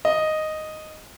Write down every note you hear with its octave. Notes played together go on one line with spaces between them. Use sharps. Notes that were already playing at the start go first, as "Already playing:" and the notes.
D#5